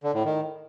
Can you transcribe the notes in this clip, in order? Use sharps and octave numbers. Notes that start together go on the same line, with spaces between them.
D3
A2
D#3